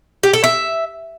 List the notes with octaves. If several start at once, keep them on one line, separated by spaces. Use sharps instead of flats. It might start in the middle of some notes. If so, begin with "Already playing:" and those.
G4
A4
E5